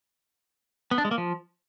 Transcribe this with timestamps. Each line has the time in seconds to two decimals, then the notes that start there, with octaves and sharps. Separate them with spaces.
0.91 B3
0.98 D4
1.05 G#3
1.11 A#3
1.18 F3